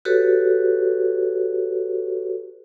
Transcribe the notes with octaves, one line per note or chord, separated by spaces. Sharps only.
F#4 G4 A4 B4 C#5